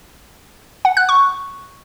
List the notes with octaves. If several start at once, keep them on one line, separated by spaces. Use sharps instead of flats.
F#5
F#6
C#6